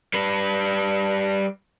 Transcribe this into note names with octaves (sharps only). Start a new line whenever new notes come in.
G3 B4